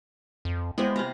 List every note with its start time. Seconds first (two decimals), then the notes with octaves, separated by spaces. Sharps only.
0.45 F2
0.78 G#3 B3 E4 G4 C5
0.96 C3 F5 A#5